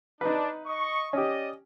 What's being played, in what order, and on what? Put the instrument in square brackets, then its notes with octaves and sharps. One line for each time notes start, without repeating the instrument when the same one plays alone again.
[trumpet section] D4 [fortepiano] D#4 B4
[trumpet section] D#5 C#6
[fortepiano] C#4 G4 [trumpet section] D5 D#5